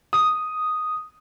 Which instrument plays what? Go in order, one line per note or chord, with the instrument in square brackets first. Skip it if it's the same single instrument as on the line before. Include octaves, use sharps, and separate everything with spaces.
[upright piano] D#6